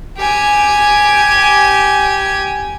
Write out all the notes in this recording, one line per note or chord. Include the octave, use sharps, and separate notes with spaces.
G4 G#5